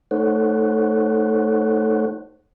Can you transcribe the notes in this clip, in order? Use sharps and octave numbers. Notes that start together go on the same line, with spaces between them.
A3 D#4 A4 C5 C#5 F#5